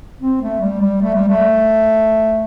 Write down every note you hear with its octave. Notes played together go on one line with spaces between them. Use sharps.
C4
A3
G3
G3
A3
G3
A3